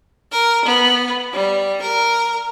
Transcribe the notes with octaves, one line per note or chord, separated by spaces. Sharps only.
A#4
B3
G3
A#4